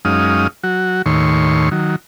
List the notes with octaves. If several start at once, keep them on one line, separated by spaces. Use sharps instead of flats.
F#2 G#3 C#4 D#4 F5 D#6
F#3 F#4
D#2 A2 D#3 C#5 C6 C#6
D#3 F#3